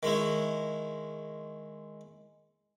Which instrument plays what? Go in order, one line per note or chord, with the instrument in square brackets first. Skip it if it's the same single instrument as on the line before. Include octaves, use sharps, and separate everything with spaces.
[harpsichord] D#3 G#3 C#4 E4